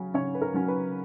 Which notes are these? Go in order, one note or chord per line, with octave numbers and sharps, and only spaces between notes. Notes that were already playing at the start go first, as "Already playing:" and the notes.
Already playing: C#3 F#3 C#4
C#3 C#4 C#5
B4
A#4
F#3 C#4
B4